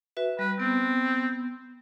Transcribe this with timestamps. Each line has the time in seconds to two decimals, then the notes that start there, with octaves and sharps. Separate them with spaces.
0.17 F#4 B4 E5
0.39 G3 B4
0.59 B3 C4